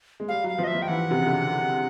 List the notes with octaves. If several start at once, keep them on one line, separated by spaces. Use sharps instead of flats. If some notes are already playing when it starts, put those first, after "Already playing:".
G#3
G3 F5
F#3 F5
F3
D#5
E5
F3
G5
E3 F#5
C3
C#3
D3